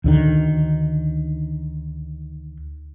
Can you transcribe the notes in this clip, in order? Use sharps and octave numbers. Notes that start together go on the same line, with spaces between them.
D2 D3 D#3